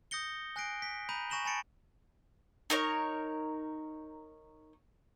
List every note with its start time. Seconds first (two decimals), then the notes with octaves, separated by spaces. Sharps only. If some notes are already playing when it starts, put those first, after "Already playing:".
0.11 D#6 G6 A#6 C#7 G7
0.56 G#5 F#6 A#6 C7 D7
0.82 B6
1.09 A#5 B5 G6 D#7
1.30 G#5 C#6 A#6 E7 F#7 G7
1.45 G#5 A5 B5 A6 C#7 D7
2.70 D#4 A#4 C#5